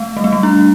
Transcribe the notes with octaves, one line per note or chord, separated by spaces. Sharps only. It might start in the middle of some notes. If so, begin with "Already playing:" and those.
Already playing: A3
G3
A3
G3
D4